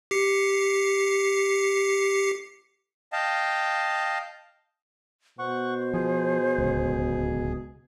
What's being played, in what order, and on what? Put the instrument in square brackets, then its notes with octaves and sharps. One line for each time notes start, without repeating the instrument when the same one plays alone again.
[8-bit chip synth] G4 C7 C#7
[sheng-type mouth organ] D#5 F5 G5 A5
[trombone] B2 [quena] C5 [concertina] F#5 C#6
[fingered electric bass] F3 [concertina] G#4
[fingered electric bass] D1 C#2